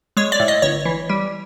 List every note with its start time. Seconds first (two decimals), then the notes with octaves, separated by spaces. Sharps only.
0.17 G#3 C#5
0.32 D5
0.40 A2
0.48 D#5
0.62 G1 C#5
0.85 E3
1.09 G3